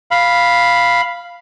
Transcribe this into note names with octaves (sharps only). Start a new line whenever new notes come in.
F5 B5